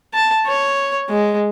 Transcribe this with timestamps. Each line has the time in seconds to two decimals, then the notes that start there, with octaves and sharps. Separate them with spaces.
0.14 A5
0.46 C#5
1.10 G#3